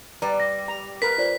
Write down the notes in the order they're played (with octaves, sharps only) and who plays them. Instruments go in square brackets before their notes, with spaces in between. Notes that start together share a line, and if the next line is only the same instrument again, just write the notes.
[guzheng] G3 [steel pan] B4 D5 [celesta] A#5
[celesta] A#6
[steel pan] A#5
[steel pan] A#4 B4 [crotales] B6
[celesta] F4 C5 D5